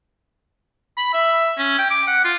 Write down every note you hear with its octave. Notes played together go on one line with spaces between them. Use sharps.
B5
E5
C#4
G5
D6
F#5
F4